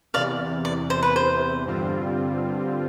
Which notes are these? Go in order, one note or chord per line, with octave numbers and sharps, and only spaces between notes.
E2 C3 E3 D5 F5
D5
C5
B4
C5
G2 D3 G3 C4 F4